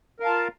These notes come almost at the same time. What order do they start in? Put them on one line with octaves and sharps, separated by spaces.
A#4 F5 A5 F4